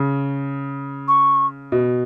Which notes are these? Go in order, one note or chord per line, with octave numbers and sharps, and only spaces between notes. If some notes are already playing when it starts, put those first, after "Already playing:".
Already playing: C#3
C#6
B2